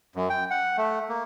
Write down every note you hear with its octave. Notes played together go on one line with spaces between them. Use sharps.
F#2
G5
F#5
A3
A#3